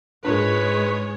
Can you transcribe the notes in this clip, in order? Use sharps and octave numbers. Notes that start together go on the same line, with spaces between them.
G#2 G#3 D4 F4 A#4 B4 C#5